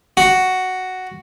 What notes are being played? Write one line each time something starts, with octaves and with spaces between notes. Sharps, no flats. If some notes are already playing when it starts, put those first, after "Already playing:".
F#4